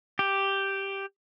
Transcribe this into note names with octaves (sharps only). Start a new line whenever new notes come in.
G4